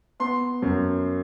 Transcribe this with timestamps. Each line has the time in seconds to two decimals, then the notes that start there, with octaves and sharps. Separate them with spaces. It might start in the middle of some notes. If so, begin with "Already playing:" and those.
0.20 B3 C6
0.62 F#2